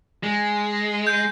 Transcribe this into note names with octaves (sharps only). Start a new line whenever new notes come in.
G#3
G6